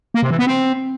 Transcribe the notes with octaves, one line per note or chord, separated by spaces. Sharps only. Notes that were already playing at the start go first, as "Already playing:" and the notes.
A#3
C3
E3
B3
C4